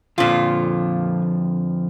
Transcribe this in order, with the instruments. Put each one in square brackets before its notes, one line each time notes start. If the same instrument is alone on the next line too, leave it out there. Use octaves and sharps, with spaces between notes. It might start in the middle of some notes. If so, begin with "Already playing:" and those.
[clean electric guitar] F2 D3 F3 [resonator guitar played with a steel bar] A#2 F4